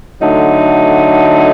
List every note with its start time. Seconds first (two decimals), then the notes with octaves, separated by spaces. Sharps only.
0.21 D3 F#3 A3 D#4